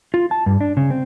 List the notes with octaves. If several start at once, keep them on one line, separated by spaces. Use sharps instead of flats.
F4
A5
G2
D4
C#3
C4